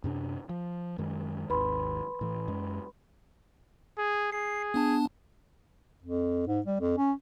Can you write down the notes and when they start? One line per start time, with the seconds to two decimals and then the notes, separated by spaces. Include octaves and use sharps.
0.04 F#2 C3 D4
0.49 F3
0.98 F#2 D#3 G#3
1.50 G#1 D#2 B4 B5 C6
2.21 A2 E3
2.48 F#2 G#3
3.98 G#4
4.32 G#4 C7
4.74 B3 D4 A5
6.02 F2
6.47 G#2
6.66 G3
6.81 F2
6.98 C#4